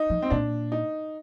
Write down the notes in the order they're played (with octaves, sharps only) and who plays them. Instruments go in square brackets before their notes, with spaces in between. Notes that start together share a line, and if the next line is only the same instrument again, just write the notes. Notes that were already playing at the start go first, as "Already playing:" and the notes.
Already playing: [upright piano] D#4
[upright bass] F3
[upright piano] C4
[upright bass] A#2 [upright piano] D4
[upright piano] D#4